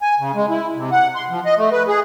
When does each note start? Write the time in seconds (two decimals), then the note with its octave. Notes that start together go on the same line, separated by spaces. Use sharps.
0.02 G#5
0.19 C#3
0.35 G#3
0.50 E4
0.76 C3
0.92 F#5
1.15 C6
1.30 F3
1.45 D#5
1.57 A3
1.72 B4
1.88 G#4